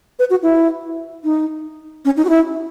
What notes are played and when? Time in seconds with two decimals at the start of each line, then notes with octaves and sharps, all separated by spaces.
0.19 B4
0.30 F#4
0.42 E4
1.24 D#4
2.05 C#4
2.17 D#4
2.25 F#4
2.29 E4